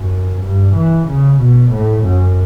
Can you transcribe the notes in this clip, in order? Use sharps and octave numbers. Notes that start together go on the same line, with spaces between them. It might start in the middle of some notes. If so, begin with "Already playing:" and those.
Already playing: F#2
G2
E3
C#3
B2
A2
F#2